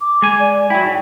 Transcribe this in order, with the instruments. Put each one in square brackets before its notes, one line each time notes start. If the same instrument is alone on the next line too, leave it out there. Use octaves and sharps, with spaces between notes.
[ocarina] D6
[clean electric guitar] G#3 G#5
[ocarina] D5
[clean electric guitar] F#3 E4 [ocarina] G5
[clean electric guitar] G#2